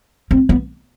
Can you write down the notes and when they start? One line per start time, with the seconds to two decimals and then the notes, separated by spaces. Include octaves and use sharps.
0.31 C4
0.49 B3